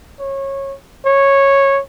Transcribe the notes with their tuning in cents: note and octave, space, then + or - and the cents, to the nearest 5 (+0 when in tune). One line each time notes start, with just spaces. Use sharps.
C#5 -20
C#5 -10